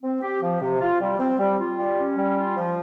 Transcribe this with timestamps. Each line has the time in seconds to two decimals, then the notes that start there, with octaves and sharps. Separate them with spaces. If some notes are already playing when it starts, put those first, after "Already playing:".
0.03 C4
0.22 G4
0.41 F3
0.60 C3
0.80 F4
1.00 G3
1.19 C4
1.39 G3
1.59 F4
1.78 G3
1.98 C#4
2.17 G3
2.36 F4
2.57 F3